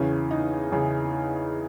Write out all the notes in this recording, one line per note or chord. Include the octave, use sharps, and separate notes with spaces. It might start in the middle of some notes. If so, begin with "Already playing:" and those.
Already playing: E2 C#3 E3 C#4
D#4
E2 C#3 E3